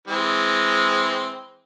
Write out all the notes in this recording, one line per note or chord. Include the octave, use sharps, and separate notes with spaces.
E3 G#3 C4